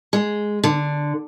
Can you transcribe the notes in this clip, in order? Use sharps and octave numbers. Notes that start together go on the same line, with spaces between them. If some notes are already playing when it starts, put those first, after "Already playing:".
G#3
D3